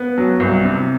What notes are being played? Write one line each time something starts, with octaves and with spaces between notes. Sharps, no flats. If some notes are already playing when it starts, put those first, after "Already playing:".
Already playing: B3
F#3
C2
C3